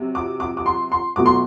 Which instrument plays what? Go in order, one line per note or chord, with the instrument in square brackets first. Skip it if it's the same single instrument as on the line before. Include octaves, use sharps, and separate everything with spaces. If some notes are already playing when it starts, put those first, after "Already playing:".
Already playing: [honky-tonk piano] C3 F#3
D6
D6
D6
C6
C6
B2 F#3 A3 D6
C6